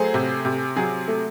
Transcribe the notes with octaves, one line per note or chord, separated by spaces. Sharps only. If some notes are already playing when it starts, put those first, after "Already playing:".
Already playing: F#3 A3 G#4 C5
C3
C3
F#3 G#4
A3